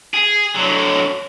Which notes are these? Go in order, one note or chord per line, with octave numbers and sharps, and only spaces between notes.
G#4
D3 F#3